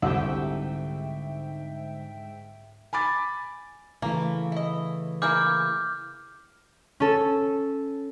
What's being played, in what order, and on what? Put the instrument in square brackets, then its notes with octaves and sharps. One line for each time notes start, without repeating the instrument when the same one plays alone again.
[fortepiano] C2 F#5 E6 [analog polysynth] G#2 E5 G5 [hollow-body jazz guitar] D3 G4
[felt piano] G#5 B5 D6 A6
[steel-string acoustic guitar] C#3 E3 A3 [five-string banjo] A#3
[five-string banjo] E4 D#5
[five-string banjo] A#3 E4 G#4 [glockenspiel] D6 F6 G6
[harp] C#4 A4